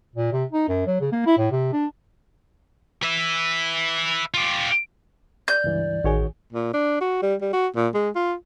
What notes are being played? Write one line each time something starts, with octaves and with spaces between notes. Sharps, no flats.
A#2
C3
D#4
F#2
F#3
C#3
A#3
E4
A2
C3
D4
B4 E5
F4 G4
D5 G6
C#2 G2 E3
A1 D#3 F#4 G#4 C#5
A#2
D4
F#4
G3
G3
F#4
A#2
G#3
F4